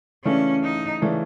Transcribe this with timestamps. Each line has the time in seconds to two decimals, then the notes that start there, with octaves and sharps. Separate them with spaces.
0.24 C#3 E3 A3 C#4 D4
0.63 D#4
1.01 C#3 E3 A3 D4